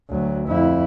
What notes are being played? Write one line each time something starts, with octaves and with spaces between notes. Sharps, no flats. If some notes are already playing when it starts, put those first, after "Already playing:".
D2 F#3
F2 E4